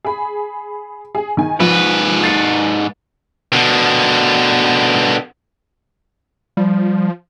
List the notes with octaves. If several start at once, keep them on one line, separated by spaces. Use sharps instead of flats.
G#4 B5
G#4
D#3 G#5
G#2 F3 B4
A6 C7 C#7
B2 D3
F3 G3